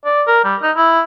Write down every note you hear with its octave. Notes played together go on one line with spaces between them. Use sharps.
D5
A#4
G3
D#4
E4